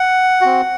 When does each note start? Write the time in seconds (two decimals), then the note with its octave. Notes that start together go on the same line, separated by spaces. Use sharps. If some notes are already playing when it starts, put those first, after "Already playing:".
Already playing: F#5
0.41 C4 F#4